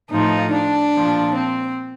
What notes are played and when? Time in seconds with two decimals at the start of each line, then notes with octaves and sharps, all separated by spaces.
0.10 A2 F3 D#4
0.53 D4
0.95 A#2 F3
1.35 C4